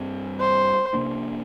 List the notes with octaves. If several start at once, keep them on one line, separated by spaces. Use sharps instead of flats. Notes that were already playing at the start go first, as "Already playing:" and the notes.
Already playing: G2 G3 C4
C5
C3 A#3 D4